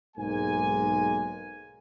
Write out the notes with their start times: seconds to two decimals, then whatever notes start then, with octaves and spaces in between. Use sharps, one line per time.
0.17 B1 G#2 G#3 A#3 G#5